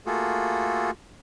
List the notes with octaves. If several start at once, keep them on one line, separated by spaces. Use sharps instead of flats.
A3 A#3 F4 F#4 G#4 A4